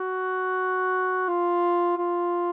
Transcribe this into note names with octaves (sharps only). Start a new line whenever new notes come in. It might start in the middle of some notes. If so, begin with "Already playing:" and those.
Already playing: F#4
F4
F4